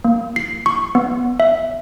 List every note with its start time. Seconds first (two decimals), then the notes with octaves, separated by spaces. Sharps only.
0.04 A#3
0.36 C7
0.66 C#6
0.95 B3
1.40 E5